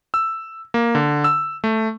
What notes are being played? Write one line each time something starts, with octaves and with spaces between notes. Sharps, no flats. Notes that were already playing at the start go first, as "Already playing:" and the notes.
E6
A#3
D3
E6
A3